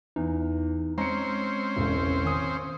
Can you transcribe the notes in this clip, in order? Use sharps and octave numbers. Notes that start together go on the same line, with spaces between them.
E2 D#4
G#3 C4 C#4 C5 A#5 C#7
E1 A1 C#3
D#3 G#5 D#6